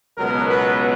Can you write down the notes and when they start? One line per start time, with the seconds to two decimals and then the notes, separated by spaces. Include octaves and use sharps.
0.17 C#2 B2 F#3 B3 A#4
0.48 B4